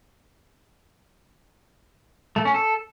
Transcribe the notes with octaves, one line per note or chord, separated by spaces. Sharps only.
A3
C#4
A4